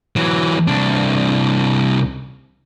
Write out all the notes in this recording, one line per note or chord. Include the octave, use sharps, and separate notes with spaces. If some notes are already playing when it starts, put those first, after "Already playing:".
E3 F#3
C2 D4